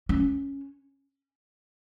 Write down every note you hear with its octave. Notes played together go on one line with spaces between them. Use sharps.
C#4